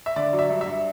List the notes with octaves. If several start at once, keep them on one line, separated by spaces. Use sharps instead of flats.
E5
D3 D5
F#3
E5
G2
E5
G2